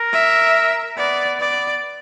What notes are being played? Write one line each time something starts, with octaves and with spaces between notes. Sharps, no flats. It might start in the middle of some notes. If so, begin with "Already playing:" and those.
Already playing: A#4
E5
B3 D5
B3 D5